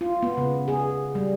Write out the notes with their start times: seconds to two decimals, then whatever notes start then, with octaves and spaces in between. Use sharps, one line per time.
0.01 F4
0.23 B3
0.37 C#3
0.68 G#4
1.15 G3